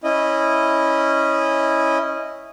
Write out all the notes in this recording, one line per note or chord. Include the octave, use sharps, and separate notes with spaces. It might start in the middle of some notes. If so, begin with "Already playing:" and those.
C#4 E4 D#5